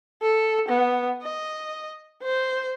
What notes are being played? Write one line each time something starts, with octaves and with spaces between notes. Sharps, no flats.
A4
B3
D#5
C5